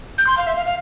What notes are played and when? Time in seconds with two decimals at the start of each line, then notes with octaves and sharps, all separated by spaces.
0.18 G6
0.27 C6
0.37 F5
0.47 E5
0.56 F5
0.66 F5